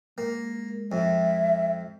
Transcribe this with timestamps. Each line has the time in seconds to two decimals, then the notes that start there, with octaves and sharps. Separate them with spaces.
0.18 G#3 A#3
0.92 F2 E5